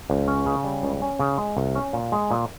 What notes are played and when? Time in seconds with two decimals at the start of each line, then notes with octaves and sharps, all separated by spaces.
0.10 C#2
0.28 C#4
0.46 C#3
0.64 G3
0.83 C#2
1.02 C#4
1.19 C#3
1.38 G#3
1.57 C2
1.75 C#4
1.93 A#2
2.12 G#3
2.31 A#2